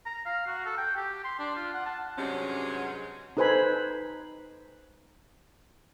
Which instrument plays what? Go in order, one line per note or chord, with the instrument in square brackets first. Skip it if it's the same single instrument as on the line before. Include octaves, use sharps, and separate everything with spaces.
[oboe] A#5
F5
F#4
A4
G5
G4
C6
D4
F4
F#5
A5
[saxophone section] G2 C3 F#3 G#3 C#4
[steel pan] D#4 A4 B4 C5 G#5 B5